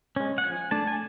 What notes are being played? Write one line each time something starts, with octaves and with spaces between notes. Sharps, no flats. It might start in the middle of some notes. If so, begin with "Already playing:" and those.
G#3 C#4
F#5
F3 G#5
A3 D4 A5
G#5